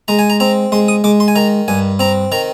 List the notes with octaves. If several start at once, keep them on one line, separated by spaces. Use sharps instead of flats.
G#3 A#5
G#5
A#5
C4 A#5
G#3 C6
D#6
G#3 D6
C6
G#5
D#3 A#5
G2 G#5
C4 A#5
D#3 A#5